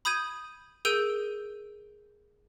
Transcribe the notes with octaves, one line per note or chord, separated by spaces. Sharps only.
B5 D#6 G6 G#6 D#7
G#4 A#4 E6 G6 D7 D#7